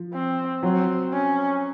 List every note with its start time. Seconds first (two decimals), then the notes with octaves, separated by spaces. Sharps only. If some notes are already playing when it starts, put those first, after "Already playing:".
Already playing: F3
0.13 C4
0.63 F#3 C4
1.12 C#4